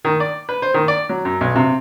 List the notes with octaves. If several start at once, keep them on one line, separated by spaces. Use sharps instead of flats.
D#3
D5
B4
C5
D#3
D5
F#3
F#2
B1
C3